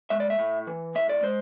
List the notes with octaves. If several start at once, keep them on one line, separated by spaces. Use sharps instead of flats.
G#3 E5
D5
E5
A2
E3
A2 E5
D5
G#3 C5